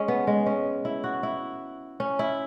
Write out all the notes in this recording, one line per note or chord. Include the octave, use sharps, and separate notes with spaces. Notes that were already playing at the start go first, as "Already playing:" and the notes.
Already playing: G#3 C#4
B3
G#3
C#4
E4
F#4
E4
C#4
E4